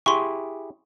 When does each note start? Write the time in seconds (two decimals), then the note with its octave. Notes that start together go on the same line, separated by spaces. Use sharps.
0.06 E4 G4 G#4 C6 C#6